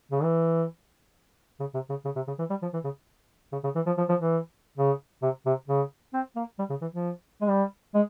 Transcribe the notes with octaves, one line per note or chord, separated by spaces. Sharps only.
C#3
E3
C#3
C3
C#3
C#3
C3
C#3
E3
G3
F3
E3
C#3
C#3
C#3
E3
F3
F3
F3
E3
C#3
C3
C3
C#3
C4
A#3
G3
C#3
E3
F3
G#3
G3
G#3